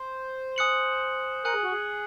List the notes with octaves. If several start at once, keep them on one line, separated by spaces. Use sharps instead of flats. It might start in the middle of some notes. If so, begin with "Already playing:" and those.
Already playing: C5
G#5 D#6 F#6 C#7 F#7
A#4 G#5 D#6 F#6 C#7 F#7
G#4
F#4
G#4